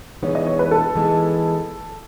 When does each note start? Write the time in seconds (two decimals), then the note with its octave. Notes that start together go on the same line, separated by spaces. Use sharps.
0.23 E3 G#3 B3 D#4 C#5
0.35 D#5
0.47 C#5
0.59 B4
0.71 A4
0.95 E3 G#3 B3 D#4